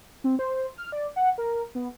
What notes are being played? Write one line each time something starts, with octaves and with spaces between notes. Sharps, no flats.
C4
C5
F6
D5
F#5
A#4
B3